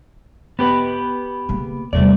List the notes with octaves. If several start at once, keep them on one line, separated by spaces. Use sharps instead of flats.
B3 G4 B4
C#3 A#3
E2 C3 G3 A3 D5